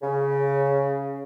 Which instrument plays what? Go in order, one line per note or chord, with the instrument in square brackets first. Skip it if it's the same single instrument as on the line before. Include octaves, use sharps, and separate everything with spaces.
[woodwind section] C#3